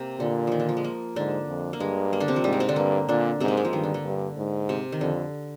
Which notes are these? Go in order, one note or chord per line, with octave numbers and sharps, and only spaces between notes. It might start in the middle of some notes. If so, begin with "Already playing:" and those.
Already playing: C3 A#3 C4
A#2 D3
D#3 F3
D3
F3
G#3
A#3
G#2 D3 D4
F2
A#3
G2 G#3
A#3
D3 D4
C3 C4
F3
G#2 G3
G#3
C3 C4
D3 D4
G2 A#3
A#2 D3 D4
G#2 C3 C4
A#3
G#3
F3
G2 D#3
D3
D3
G2
G#2
C3
D#3
F2 D3